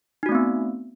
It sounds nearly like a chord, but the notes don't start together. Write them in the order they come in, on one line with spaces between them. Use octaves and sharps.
D#4 F#4 A3 C4 B3